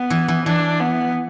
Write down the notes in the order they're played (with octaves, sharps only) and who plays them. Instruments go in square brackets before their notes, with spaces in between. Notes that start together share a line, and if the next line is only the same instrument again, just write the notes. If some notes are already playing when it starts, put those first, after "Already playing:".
Already playing: [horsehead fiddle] B3
[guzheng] E3
E3
[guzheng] E3 [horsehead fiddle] D4
[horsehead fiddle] B3